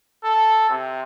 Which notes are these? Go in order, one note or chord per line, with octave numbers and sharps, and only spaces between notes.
A4
C3